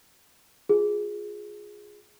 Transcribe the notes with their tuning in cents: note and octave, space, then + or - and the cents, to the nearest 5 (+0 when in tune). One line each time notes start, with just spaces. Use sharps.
F4 +20 G#4 +0